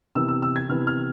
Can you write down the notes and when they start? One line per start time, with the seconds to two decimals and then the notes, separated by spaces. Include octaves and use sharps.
0.15 C3 E3 B3 E6
0.28 E6
0.42 E6
0.56 G#6
0.69 C3 E3 B3 F6
0.87 F6